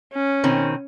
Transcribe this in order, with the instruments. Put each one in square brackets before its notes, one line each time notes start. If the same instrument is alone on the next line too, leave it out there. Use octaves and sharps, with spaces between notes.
[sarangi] C#4
[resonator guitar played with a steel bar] B2 D#3 C4